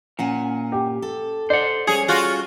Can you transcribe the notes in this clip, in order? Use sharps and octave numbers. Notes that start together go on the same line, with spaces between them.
A#2 C#4 F#5 G#5
G4
A4
C5 D5 F#5
G3 C#4 G#4 C#5
F4 F#4